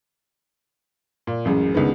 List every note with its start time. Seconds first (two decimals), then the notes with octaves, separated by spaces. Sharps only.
1.27 A#2
1.45 A1 F#2 G#3
1.74 C#2 D3 D#3 G#3 B3